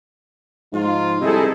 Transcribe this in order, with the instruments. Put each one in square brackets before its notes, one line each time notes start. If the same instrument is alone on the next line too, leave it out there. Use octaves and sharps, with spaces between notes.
[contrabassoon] G#2 [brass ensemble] F3 D#4 F4
[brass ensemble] G2 E4 [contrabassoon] C3 [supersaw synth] D#4 G#4 A4